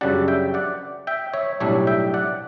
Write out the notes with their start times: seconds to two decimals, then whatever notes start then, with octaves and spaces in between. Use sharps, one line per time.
0.01 F#2 C#3 G3 D4 F#5 A5
0.28 E5 G5
0.54 D5 F#5
1.07 E5 G5
1.34 C#5 E5
1.60 B1 A2 G3 D4 C#5 E5
1.87 E5 G5
2.14 D5 F#5